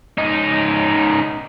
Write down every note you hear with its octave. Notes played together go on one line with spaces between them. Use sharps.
C#2 D#4